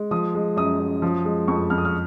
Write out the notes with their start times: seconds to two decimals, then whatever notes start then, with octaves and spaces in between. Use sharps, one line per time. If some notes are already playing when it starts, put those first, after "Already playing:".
Already playing: G#3
0.11 F3 D#6
0.35 G#3
0.56 F#2 D#6
0.79 F#2
1.02 F3
1.25 G#3
1.48 F2 C#6
1.70 F2 F6
1.78 D#6
1.85 F6